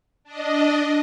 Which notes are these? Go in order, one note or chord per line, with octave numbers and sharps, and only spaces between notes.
D4 D#5